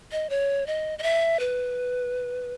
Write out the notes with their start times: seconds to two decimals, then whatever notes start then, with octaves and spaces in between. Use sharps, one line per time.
0.12 D#5
0.30 C#5
0.67 D#5
0.99 D#5
1.03 E5
1.40 B4